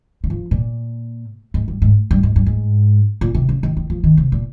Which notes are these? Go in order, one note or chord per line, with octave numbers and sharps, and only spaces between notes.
D#3
F3
A#2
G#2
G2
G#2
G2
G#2
G2
G#2
A#2
C3
C#3
D#3
D#3
F3
D#3
C3
A#2